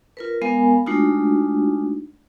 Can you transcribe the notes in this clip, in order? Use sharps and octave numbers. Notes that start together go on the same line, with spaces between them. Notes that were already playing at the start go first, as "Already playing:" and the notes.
F4 A#4 B4
G#3 B3 A#4 F5 G#5 B5
G#3 A3 D4 D#4 F4 F#4